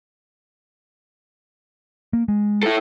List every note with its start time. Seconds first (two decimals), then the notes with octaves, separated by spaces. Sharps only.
2.13 A#3
2.28 G#3
2.63 E4 A4